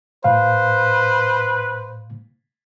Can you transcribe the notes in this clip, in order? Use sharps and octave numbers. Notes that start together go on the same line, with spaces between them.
A2 B4 C5 F5